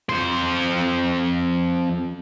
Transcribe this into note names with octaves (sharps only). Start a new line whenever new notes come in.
F2 C5